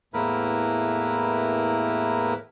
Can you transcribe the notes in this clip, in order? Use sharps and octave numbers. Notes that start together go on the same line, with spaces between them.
E2 A2 A#3 E4 A#4 B4